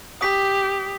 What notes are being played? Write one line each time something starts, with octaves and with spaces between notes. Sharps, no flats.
G4 D#6 B6